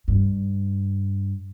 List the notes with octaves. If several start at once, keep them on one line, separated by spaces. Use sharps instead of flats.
G2